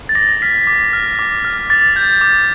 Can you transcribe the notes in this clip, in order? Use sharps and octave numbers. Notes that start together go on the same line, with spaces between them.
A6
D6 A#6
F6 B6
D6
F6
D6
F6
D6 A6
G6
D6